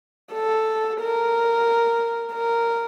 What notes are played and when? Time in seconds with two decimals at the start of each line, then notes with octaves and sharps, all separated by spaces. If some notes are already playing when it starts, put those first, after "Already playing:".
0.33 A4
1.00 A#4
2.33 A#4